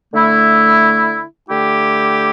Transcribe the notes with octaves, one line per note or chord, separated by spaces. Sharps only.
D3 A3 E4
D3 A3 E4 G4